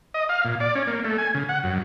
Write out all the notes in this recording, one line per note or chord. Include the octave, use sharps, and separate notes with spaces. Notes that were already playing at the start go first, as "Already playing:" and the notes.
D#5
F5
A#2
D5
C#4
A#3
A3
G#5
C#3
F#5
F#2